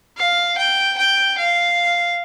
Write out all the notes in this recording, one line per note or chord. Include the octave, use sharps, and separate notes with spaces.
F5
G5
G5
F5